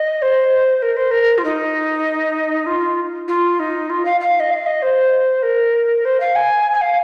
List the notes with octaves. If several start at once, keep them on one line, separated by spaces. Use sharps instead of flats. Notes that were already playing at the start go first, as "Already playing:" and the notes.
Already playing: D#5
C5
A#4
C5
A#4
F4
D#4
F4
F4
D#4
F4
F5
F5
D#5
F5
D#5
C5
A#4
C5
F5
G#5
G#5
F5